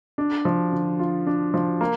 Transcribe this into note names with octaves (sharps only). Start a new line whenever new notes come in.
D4
F3
D3
F4
D4
F3
A#3